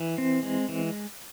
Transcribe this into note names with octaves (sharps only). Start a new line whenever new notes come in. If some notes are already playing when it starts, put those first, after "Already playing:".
Already playing: E3
C4
G#3
E3